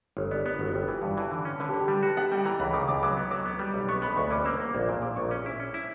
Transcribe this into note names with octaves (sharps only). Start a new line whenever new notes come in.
G1 C#5
B3 D5
B3 A#4
G1 F#4
G1 G4
E3
G2
E3
D3
C#4
D3 B4
G4
D3
G4
G3
F#4 G4
B3 F#5
G3 G5
E3 A#5
C#2 B5
C#3 D6
C#2 D6
F#3 D6
B3
F#3 D6
B3
G3
B1
B3 C#6
B3 B5
D2 C#6
C#4 D6
A#3 E6
A#3
A#1
A#2
A#2 D6
A#1 C#6
C#4 D6
E4
C#4
E4